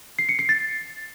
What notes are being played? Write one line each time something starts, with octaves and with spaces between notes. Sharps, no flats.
C7
C#7
C7
A6